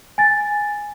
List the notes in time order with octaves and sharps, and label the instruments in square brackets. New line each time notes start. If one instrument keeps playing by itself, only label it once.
[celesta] G#5 A6